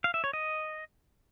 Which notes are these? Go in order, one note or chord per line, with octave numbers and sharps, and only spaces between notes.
F5
E5
C#5
D#5